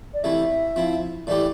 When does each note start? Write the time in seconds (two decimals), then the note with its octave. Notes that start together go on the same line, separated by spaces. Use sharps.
0.14 D5
0.24 C3 E3 A3 E4 E5
0.76 F3 C4 E4
1.27 A2 E3 A3 E4 G4 D5